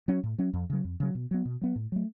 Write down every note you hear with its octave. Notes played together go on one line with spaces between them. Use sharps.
F#3 C#4
A2
F#3 C#4
F2
C#3 F#3
F2
C#3 F#3
B2
F#3 B3
B2
F#3 B3
A2
F#3 A3